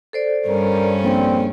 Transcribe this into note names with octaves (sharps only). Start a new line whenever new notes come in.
A4 C5 D5
G2 G3 C#4 A#4
A#1 C4